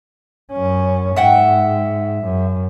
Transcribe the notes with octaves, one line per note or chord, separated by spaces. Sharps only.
F#2 C#4
G#2 E5 F#5 G5
F#2